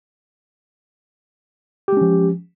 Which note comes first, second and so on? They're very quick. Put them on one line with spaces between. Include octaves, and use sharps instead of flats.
G4 G#3 C#4 F3